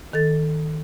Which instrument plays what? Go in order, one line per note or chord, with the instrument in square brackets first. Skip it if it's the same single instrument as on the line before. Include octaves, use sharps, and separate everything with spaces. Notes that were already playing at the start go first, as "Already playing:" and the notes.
[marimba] D#3 A4 A6